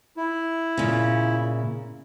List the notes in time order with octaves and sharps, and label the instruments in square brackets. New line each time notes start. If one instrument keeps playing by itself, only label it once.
[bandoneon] E4
[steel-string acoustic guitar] A#2 C#3